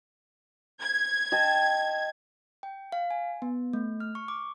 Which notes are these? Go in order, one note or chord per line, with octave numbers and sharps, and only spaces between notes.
G#6
D#5 G5 A5
G5
F5
G#5
B3
A3
F6
C#6
D6